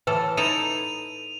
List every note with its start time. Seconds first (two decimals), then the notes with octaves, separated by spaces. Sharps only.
0.07 A2 E3 A4 B4
0.37 D#4 E4 A4 D#7 F7